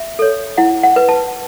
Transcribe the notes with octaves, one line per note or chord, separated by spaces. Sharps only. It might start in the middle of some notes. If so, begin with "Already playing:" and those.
Already playing: E5
A4 C#5
E4 F#5
F#5
B4
A5